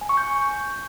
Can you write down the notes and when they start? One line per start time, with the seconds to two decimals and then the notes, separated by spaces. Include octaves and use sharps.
0.01 G#5
0.09 C#6
0.17 G6